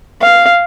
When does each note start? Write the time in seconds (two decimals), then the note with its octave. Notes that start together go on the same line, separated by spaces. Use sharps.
0.21 F5